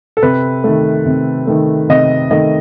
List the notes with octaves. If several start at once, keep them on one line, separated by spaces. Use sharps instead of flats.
A4
C3 B4
D#3 A3
C3
D#3 A3
C3 D#5
D#3 A3 D#5